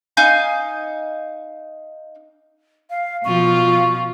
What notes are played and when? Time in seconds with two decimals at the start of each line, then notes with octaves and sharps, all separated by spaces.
0.17 D#4 F5 G#5 G6
2.90 F5
3.25 B2 F3 F4 C#6